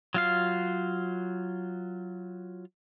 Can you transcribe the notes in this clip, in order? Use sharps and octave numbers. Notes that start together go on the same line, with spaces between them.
F#3 F4 F5